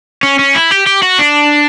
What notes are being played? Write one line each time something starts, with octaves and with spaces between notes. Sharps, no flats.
C#4
C#4
E4
G4
G4
F#4
D4